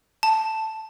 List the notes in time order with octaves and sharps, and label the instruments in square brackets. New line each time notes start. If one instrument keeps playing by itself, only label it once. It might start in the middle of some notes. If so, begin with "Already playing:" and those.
[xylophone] A5